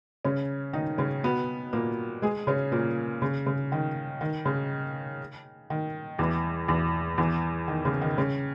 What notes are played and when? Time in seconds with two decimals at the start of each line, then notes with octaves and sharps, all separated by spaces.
0.25 C#3 C#4
0.73 D#3 D#4
0.98 C#3 C#4
1.23 B2 B3
1.73 A#2 A#3
2.22 G#3 G#4
2.47 C#3 C#4
2.72 A#2 A#3
3.22 C#3
3.46 C#3
3.72 D#3
4.21 D#3
4.45 C#3
5.70 D#3
6.19 E2 E3
6.68 E2 E3
7.18 E2 E3
7.68 D#3
7.85 C#3
8.02 D#3
8.18 C#3